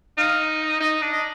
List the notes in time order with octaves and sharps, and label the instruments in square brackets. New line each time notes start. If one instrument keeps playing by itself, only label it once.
[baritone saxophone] D#4 [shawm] F5
[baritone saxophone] D#4 [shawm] D#5
[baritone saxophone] D4
[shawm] D#5